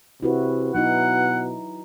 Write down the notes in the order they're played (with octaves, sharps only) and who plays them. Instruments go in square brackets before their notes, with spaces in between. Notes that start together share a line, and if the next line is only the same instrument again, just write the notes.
[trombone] C3 [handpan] E4 F#4 B4
[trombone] B2 [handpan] F#3 D#4 E4 [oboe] F#5